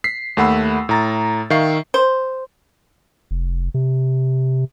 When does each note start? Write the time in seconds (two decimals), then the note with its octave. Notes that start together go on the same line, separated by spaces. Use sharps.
0.04 B6 C7
0.37 D#2 A3 F#5 B5 E6
0.89 A2 A#5 A6
1.50 D#3 E5 F5 C#6 C7
1.94 C5
3.31 F1
3.74 C3